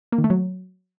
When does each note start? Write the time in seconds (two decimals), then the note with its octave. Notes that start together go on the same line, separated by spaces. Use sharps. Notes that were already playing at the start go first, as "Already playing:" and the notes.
0.12 A#3
0.18 D#3
0.24 A3
0.30 F#3